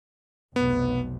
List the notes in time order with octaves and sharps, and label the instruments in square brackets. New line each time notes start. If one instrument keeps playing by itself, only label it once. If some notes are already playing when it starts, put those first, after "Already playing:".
[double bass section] F1 B1 [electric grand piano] B3